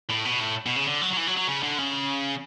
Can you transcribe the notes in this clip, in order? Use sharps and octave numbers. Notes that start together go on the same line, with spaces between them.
A2
B2
A2
B2
C#3
D3
F#3
F#3
E3
F#3
F#3
C#3
D3
C#3